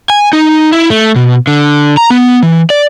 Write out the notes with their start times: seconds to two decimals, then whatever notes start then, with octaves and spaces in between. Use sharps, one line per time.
0.10 G#5
0.33 D#4
0.72 E4
0.90 A3
1.16 B2
1.47 D3
1.97 A#5
2.10 B3
2.43 E3
2.70 D5